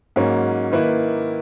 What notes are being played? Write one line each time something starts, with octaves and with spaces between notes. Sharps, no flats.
G#2 F#3 A#3 C#4
D#3 A#3 E4 B4